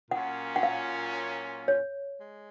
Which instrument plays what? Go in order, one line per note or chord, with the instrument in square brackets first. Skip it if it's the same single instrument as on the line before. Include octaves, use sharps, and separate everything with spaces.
[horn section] A#2 F#3 A#3 C#4 F4 [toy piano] F#5
[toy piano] F#5
F5
C#5
[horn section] G#3